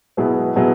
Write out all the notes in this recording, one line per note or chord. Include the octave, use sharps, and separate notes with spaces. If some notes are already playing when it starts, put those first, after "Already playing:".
B2 F#3 B3 E4 G#4
B2 F#3 B3 E4 G#4